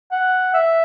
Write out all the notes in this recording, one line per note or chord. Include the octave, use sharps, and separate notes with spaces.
F#5
E5